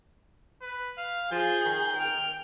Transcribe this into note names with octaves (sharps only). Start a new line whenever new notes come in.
B4
F5
F3 G#4 G6
D#3
G5 F6